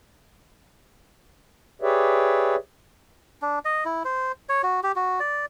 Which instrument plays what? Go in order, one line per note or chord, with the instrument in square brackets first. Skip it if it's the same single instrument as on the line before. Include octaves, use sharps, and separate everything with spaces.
[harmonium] G4 G#4 B4 C#5 D5 E5
[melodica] D4
D#5
E4
C5
C#5
F#4
G4
F#4
D5